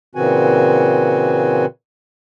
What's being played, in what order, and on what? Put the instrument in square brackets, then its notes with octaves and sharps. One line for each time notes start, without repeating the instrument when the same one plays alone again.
[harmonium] A#2 C#3 E3 C4 F#4 G#5